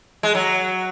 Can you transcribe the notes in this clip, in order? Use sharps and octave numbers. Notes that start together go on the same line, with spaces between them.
G#3
F#3